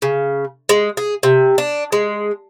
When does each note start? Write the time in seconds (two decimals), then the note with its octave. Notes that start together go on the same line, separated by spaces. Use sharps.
0.02 C#3
0.69 G#3
0.97 G#4
1.23 C3
1.58 D4
1.92 G#3